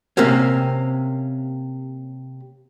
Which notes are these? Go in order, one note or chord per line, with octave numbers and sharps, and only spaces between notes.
C3 A#3 C4 C#4